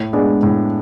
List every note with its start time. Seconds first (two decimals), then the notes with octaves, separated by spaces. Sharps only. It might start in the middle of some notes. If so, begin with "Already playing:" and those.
Already playing: A2
0.13 G#3 B3 D4
0.43 A2